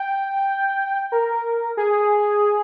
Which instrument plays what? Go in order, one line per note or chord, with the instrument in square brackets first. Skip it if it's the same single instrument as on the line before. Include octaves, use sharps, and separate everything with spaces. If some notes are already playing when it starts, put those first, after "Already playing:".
Already playing: [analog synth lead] G5
A#4
G#4